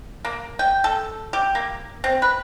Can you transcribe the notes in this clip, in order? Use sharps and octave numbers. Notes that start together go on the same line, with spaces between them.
A#3
G5
A4
G4
A#3
C4
B4